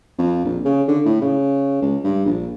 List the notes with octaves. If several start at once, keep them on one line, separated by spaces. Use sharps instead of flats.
F2
A#1
C#3
D3
A2
C#3
C#2
G2
A#1